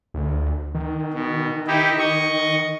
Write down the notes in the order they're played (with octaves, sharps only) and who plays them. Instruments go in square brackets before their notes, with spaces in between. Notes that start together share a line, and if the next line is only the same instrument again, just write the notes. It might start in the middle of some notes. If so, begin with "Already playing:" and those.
[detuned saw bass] D2
D#3
[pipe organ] B2
D#4 E4 G4
D#5 C#6